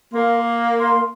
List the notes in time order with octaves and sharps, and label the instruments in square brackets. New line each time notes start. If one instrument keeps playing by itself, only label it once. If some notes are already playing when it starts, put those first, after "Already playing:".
[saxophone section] A#3 [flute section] A#4 F5 C6
[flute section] A#4 F5 C6